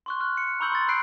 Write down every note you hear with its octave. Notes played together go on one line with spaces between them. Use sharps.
C6 C#6 F#6
C#6 F6 F#6
C#7
A#5 B5 C#6 E6 G6 F#7
C6 A6
B5 E6 F#6 G6 C7 D7